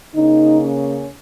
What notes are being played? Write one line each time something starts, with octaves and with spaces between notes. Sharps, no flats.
C#3 A#3 D#4
C#4